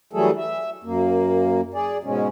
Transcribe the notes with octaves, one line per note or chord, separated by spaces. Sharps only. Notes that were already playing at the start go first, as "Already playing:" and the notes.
E3 F#3 G3 A3 G#4 A4
E5
F#2 A#3
G#4 D5
G#2 B2 G#3 C#4